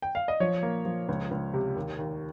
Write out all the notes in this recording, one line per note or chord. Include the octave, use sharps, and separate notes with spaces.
G5
F5
D#5
F3 C#5
A#3
F3
C#2
C#2
C3
D#2
D#2